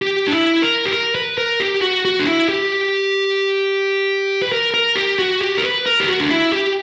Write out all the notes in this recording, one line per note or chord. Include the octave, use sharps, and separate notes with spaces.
G4
D4
E4
A#4
G4
A#4
B4
A#4
G4
F#4
F#4
D4
E4
G4
B4
A#4
A#4
G4
F#4
G4
A#4
B4
A#4
G4
F#4
D4
E4
G4